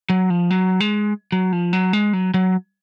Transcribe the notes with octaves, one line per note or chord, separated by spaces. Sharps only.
F#3
F3
F#3
G#3
F#3
F3
F#3
G#3
F#3
F#3